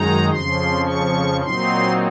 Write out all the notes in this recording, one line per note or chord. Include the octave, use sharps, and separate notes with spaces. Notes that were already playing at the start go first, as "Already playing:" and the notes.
Already playing: F#2 D#3 G#3 D#4 A#5
F2 C#3 F3 C6
C#6
A#2 F#3 C4 D#4 C6